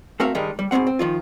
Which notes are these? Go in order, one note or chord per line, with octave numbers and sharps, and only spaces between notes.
A3 C4 F#4 A#4 E5 F5
G2 D#3 G3 G#3 D#4
G3
G#2 B2 G#3 C4 F#5
C4
D#3 F3 F4